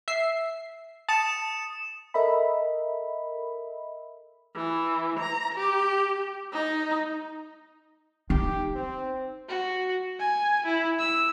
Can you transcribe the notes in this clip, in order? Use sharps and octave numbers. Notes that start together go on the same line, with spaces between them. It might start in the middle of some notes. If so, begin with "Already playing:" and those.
E5 C7
A5 D#6 C#7 E7
A4 A#4 D#5 E5 B5
E3
A#5
G4
D#4
D#4 G4
C4
F#4
G#5
E4
E6